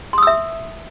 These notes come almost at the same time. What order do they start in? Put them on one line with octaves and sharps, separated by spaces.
C6 D#6 E6 E5